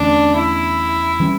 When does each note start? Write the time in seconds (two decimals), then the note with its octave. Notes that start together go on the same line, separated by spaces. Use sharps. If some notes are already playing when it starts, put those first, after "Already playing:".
Already playing: E2 D3 A3 C#4 D4
0.37 E4
1.20 E3 G3 C#4